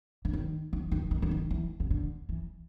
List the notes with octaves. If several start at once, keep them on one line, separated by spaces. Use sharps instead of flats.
D3
D#3
D#3
D#3
D#3
D3
D#3
E3
C#3
D3
E3